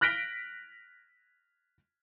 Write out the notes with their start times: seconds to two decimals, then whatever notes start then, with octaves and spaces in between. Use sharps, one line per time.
0.01 F6 F#6 A#6 B6 D7 G7